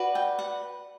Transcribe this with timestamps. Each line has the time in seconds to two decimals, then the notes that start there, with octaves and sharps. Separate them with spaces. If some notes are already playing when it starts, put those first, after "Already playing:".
Already playing: F#4 B4 D5
0.15 G5
0.39 F#5